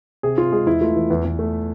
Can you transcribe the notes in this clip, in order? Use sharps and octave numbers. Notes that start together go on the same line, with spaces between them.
C3 G#4
C3 F4
G#3 G#4
E2 E4
A3 F4
E3
E2
E2
A3